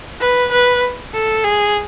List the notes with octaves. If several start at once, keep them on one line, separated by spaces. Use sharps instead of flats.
B4
B4
A4
G#4